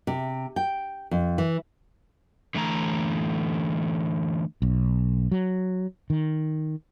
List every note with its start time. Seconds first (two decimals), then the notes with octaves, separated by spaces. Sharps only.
0.07 C3
0.56 G5
1.11 F2
1.38 E3
2.55 D3 E3 A3 A#5
4.62 B1
5.32 F#3
6.10 D#3